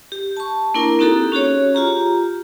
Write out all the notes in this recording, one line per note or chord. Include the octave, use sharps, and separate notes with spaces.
G4
A5 C#6
A#3 D4 E4 A#4
A#3 C4 D#4 F#4 G4 A4
C#4 F#4 G#4 C#5
F4 G4 A#5